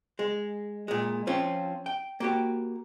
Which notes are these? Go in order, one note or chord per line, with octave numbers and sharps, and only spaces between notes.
G#3
A#2 G#3
F3 C4 C#4 F4
G5
A#3 F#4 G4